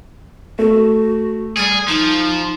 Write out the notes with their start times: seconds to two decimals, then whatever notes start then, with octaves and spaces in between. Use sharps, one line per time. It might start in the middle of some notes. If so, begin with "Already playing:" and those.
0.59 A3 F#4
1.57 G3 G#4
1.88 F3 D#4